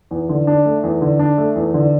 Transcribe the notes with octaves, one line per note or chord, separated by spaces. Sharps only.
E2
D3
D4
A3
E2
D3
D4
A3
E2
D3